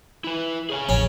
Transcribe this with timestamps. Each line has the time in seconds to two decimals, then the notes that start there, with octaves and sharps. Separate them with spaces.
0.24 E4 B4
0.70 G#4 C#5 G#5
0.89 A1 F2 C#4